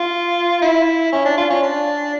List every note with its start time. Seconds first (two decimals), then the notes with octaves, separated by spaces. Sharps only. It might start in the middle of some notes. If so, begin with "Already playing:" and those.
Already playing: F4
0.62 E4
1.12 C#4
1.25 D4
1.38 F4
1.50 C#4
1.63 D4